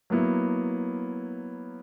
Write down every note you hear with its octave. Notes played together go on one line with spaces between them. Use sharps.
F#3 A#3 B3 E4